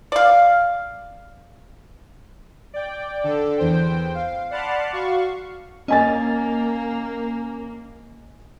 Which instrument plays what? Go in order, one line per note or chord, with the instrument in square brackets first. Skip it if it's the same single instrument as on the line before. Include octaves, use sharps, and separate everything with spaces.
[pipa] D5 F5
[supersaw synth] D5 G5
D3 A4
E2 C5 G5
F5
D5 F#5 A5 B5 C6 F6
F#4 F5 C#6
[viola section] A#3 [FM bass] C#4 [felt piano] D#5 G#5 A6